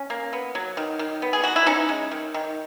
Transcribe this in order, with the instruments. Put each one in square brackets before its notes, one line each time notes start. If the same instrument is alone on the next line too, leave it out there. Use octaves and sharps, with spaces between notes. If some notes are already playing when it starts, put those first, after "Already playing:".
Already playing: [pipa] C#4
A#3
B3
F#3
D#3
D#3
B3
G#4
F#3 F#4
E4
C#4 D#4
G#3
D#3
D#3